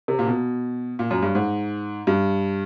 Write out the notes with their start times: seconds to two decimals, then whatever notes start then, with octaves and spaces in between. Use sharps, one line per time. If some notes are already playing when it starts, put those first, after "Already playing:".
0.08 C3
0.19 A#2
0.27 B2
0.99 A#2
1.11 F#2
1.23 G2
1.35 G#2
2.07 G2